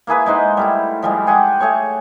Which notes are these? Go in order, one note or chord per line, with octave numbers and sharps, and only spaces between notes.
A#3 E4 G#4 B4
G#3 D#4 C5 F#5
G3 A3 E4
F3 G3 G#3
G4 G#4 F#5 G5
A3 G#4 C#5 C#6